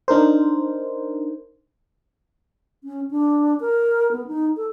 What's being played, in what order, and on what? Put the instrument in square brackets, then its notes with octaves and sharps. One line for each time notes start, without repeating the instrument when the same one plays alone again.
[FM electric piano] D4 D#4 A#4 C5
[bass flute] C#4
D4
A#4
B3
D#4
A4